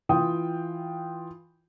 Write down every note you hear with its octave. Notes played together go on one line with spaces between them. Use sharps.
E3 F4 G5 D#6